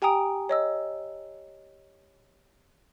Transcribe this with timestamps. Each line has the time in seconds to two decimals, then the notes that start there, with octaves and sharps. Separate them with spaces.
0.02 G4 G5 G#5 A#5 D#6 D7
0.49 C#5 D#5 E6